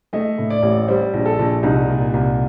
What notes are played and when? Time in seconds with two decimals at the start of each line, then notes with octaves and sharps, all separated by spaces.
0.13 A3 D#5
0.38 A2
0.50 D5
0.63 A1
0.88 G3 C5
1.14 A#1
1.25 A4
1.39 A#1
1.63 C2 D#4
1.88 A#2
2.13 C2